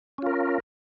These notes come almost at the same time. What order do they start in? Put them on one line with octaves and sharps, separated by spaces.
C#4 F4 A#4